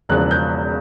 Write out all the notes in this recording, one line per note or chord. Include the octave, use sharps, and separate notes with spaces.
E1 E2 C#3 F3 F#6
G6